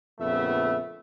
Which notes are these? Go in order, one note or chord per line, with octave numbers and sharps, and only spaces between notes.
A#1 F2 C#3 A3 B3 E5